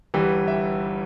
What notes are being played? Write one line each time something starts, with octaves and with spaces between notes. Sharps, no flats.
G1 G2 E3 G3 G5
E5
G5